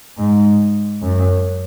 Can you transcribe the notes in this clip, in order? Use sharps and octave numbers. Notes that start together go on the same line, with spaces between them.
G#2
F#2